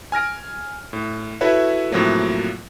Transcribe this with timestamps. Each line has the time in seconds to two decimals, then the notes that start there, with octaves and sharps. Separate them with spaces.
0.12 G#5 F6 A#6 D7
0.93 A2
1.41 E4 F#4 A4 B4 C#5 E5
1.92 A2 C3 F3 F#3 A#3